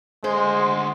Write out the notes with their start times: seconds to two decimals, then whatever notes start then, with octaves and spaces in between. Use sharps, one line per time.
0.24 D2 G#3 C5 C6